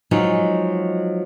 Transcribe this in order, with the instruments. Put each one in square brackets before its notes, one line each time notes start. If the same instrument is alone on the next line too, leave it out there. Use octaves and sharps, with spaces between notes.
[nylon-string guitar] F3 F#3 G#3 D#4